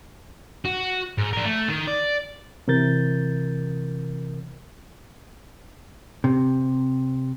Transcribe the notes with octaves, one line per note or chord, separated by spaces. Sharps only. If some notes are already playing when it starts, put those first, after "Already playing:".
F#4
G#2
D4 A#4
A3
D#3
D5
C3 E3 A#4 G6 A6
C3